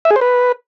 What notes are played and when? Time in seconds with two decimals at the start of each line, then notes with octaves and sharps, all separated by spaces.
0.05 E5
0.11 G#4
0.16 C5
0.21 B4